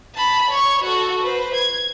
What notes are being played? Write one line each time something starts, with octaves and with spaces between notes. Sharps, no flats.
A5 B5
C#5 C#6
F#4 A4
B4 C5
G#6